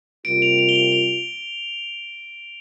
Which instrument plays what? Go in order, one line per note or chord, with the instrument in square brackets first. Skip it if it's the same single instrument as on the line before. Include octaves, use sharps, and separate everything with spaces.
[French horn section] C3 G3 A#3 F4 [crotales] D7
[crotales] F7
F7
G7
F7
F7